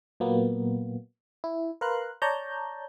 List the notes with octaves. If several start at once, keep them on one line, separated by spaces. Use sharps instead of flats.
A#2 F#3 A#3 B3
E4
A#4 B4 F5 A#5 C6 F#6
C#5 D5 A5 A#5 G6